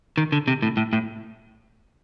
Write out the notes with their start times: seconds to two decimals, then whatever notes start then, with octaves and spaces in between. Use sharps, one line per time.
0.18 D#3
0.32 D3
0.48 C3
0.62 A2
0.77 A2
0.93 A2